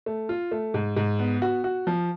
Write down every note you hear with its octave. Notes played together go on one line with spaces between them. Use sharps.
A3
F4
A3
G#2
G#2
B3
F#4
F#4
F3